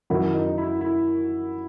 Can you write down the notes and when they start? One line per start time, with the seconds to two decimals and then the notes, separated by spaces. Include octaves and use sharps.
0.10 F#2 D#3 F#3 E4
0.33 D#4
0.46 D#4
0.58 E4
0.81 E4